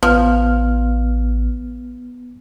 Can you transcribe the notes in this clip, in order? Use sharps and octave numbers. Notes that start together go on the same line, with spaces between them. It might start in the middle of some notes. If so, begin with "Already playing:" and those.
A1 F3 B3 F6